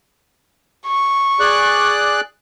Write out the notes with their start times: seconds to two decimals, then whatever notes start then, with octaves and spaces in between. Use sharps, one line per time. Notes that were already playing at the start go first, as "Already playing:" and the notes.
0.87 C#6
1.40 G#4 D5 F#6